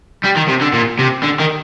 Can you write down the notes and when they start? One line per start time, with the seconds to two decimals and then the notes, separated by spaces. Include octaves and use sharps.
0.24 G3
0.36 D#3
0.48 C3
0.61 D3
0.73 A#2
0.99 C3
1.23 D3
1.40 D#3